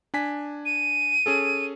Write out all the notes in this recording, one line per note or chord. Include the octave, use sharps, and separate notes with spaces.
D4 G#5 B6
D#7
C#4 G#4 A4